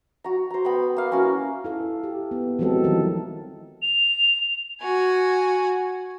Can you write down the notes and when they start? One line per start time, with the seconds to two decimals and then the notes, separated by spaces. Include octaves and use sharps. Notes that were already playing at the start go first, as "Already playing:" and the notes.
0.24 F#4 A#5
0.50 C5 A#5
0.65 B3 G5 B5
0.96 A#3 F5
1.11 A#3 C#4 E4 F#4
1.64 E4 A4 F5
2.03 G4
2.31 B3
2.59 E3 F#3 G#3 C4 A4
2.84 D#3 F3 G3 E4 G4 A#4
3.82 F7
4.81 F#4 G#5